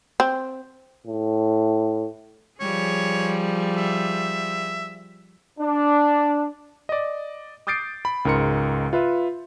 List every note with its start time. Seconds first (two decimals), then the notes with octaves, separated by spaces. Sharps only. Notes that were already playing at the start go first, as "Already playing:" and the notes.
0.20 C4
1.07 A2
2.60 F3 G3 G#4 C#5
3.77 E5
5.59 D4
6.89 D5 D#5
7.67 D6 D#6 G6 A6 C7 D7
8.05 B5
8.25 C#2 G#2 A#4 C6 C#7
8.93 F4 B4 E5